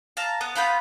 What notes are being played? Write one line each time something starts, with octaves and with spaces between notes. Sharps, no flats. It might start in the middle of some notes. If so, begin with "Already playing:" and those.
F5 A5 A#5
B3
B3 F4 B5 G6